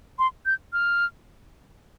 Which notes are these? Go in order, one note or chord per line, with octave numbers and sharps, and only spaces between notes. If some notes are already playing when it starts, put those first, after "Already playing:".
C6
G6
F6